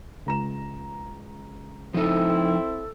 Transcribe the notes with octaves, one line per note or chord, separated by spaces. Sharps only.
C#2 A#5 E7
F3 C4 D#4 E4 A4